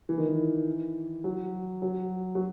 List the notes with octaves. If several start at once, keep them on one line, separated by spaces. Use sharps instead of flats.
E3
D#3
E3
F#3
F#3
F#3